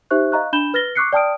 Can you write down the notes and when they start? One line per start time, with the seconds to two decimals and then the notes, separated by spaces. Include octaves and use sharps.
0.11 D#4 G4 C5 E5 C#6 F#6
0.32 D#5 F5 A#5 C#6 F#6
0.53 D4 B5 G6 E7 G7
0.74 B4 F6 A6 A#6 G7
0.95 C#6 D6 E6 F#6 C7 C#7
1.13 D5 G5 A5 D#6 F6 D7